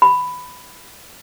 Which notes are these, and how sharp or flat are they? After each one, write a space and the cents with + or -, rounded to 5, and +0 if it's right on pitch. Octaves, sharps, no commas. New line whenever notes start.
B5 +10